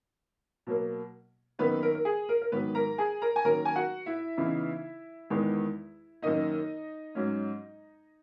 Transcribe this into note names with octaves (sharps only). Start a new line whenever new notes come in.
B2 F#3 A#3
F#2 D#3 A#3 B3 D#4 B4
A#4
A#4
G#4
A#4
A#4
G#2 D#3 F#3 B3 B4
A#4 A#5
G#4 G#5
A#4 A#5
G#5
D#3 F#3 A#3 C#4 A#4 A#5
G#5
F#4 F#5
E4 E5
C#3 E3 B3 D#4
E2 D#3 G#3 B3
F#2 D#3 A#3 D#4 D#5
G#2 F#3 C#4